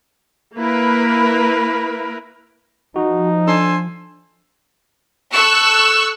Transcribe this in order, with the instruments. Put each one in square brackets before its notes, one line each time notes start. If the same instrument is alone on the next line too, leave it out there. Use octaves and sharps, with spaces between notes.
[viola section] A#3 E4 A#4 B4 B5
[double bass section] F3 [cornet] D#4 [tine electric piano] F#4
[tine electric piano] D4 [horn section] A4 C5 G#5
[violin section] A4 C#6 E6 F#6